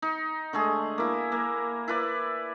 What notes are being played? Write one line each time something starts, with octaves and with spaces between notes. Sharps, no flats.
D#4
D3 G#3 A3 G#4
A#3 E4
A#3
E4 B4 D5